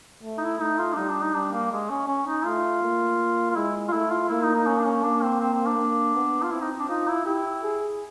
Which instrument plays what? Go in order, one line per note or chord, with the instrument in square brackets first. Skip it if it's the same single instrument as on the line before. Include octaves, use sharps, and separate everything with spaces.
[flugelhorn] A3
[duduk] D#4
E4
[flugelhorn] A3 [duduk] D#4
[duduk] F4
D4
[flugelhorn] G3 [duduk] D#4
[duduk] D4
D#4
[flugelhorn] G3 [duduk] D4
[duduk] A#3
G#3
C#4
C#4
D#4
[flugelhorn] A3 [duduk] F4
[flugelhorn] A#3
[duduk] F4
[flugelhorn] G#3 [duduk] E4
[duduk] F4
[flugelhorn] A3 [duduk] E4
[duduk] F4
[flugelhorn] A#3 [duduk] E4
[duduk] D#4
D#4
C#4
D4
C#4
[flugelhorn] A#3 [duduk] D4
[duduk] C4
C4
C4
D4
[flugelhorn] A#3
B3
[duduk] F4
[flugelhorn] C4 [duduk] E4
[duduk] D#4
D4
[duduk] D#4 [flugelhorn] F4
[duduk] E4
[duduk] E4 [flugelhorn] G4
[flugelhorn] G#4